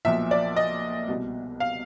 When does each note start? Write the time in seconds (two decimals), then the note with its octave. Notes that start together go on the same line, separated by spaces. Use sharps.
0.05 B1 A#2 F3 E5
0.31 D5
0.56 D#5
1.09 C2 B2
1.60 F5